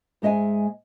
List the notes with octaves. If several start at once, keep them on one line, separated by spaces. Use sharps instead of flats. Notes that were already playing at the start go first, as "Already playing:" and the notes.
G#2 G#3 D#5 E5 G#5